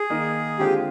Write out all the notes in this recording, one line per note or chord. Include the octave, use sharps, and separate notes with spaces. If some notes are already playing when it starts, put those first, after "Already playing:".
Already playing: G#4
D#3 A#3 D#4 A#4
D3 G#3 C4 F4 G4